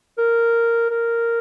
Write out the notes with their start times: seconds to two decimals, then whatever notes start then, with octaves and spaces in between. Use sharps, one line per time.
0.18 A#4
0.90 A#4